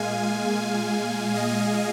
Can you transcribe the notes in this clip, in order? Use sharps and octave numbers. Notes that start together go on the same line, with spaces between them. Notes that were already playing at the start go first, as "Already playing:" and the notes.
Already playing: A#2 G#3 F5 G#5
D#5